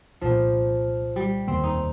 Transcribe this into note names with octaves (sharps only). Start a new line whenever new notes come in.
C2 A#2 F3 A#3
G3
F1 D#2 D#3 A#3 C4
D#4